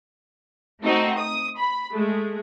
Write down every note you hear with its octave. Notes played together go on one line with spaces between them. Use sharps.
A3 C4 D#4 F#4
D#6
B5
G#3 A3